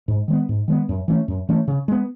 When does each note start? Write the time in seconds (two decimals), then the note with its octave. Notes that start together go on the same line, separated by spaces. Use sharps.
0.08 G#2
0.28 D#3 G#3 B3
0.49 G#2
0.68 D#3 G#3 B3
0.89 F#2
1.08 E3 A3 C#4
1.28 F#2
1.49 E3 A3 C#4
1.68 C#3
1.88 G#3 B3